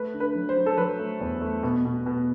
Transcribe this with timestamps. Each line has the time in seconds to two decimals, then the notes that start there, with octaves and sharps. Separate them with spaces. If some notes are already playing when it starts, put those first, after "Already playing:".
Already playing: A3 B4
0.14 D3
0.20 B4
0.35 F#3
0.49 C5
0.56 F#3
0.66 A4
0.77 F#3 B4
0.99 A3
1.20 E2
1.41 A3
1.63 B2
1.85 B2
2.06 B2